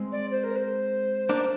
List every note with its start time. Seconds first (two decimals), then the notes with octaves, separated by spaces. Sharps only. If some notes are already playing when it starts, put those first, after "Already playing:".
Already playing: G#3 C4
0.11 D5
0.30 C5
0.43 A#4
0.55 C5
1.29 A#3 D4